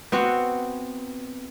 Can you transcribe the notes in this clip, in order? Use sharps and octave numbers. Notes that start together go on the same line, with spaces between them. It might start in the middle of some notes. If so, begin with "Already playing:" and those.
B3 C4 F#4